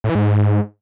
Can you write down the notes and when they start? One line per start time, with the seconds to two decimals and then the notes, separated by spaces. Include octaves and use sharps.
0.04 A2
0.10 E3
0.15 G#2